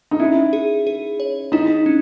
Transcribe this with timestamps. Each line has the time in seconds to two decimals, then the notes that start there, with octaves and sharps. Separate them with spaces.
0.11 D#4
0.20 C#4 E4
0.53 G#4
0.87 G#4
1.20 C#5
1.52 D#4 E4
1.86 C#4